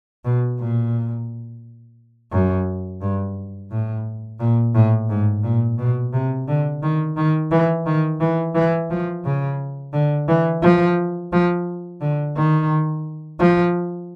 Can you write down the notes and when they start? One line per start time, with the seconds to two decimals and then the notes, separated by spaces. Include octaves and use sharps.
0.25 B2
0.59 A#2
2.32 F#2
3.02 G2
3.71 A2
4.40 A#2
4.75 A2
5.09 G#2
5.44 A#2
5.78 B2
6.13 C3
6.48 D3
6.82 D#3
7.17 D#3
7.51 E3
7.86 D#3
8.20 E3
8.55 E3
8.90 F3
9.25 C#3
9.93 D3
10.28 E3
10.62 F3
11.32 F3
12.01 D3
12.36 D#3
13.40 F3